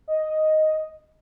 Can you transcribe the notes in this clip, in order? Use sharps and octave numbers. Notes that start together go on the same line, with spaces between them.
D#5